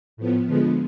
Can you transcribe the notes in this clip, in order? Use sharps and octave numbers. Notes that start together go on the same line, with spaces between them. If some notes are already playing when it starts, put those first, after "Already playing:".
A2 F3 B3
D3 F3 G#3 B3